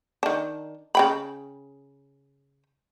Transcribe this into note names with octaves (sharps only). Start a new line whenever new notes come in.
D#3 D4
C#3 G5 B5